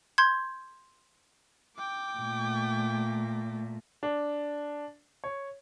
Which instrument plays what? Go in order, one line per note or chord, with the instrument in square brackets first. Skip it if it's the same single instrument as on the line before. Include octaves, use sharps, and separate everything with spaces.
[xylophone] C6 G6 G#6
[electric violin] G5 D6
[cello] A#2 A3
[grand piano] D4
C#5